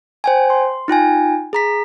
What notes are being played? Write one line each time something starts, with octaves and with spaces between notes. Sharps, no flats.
C5 G5 G#5
C6
D#4 F4 G5 G#5
G#4 A#5 B6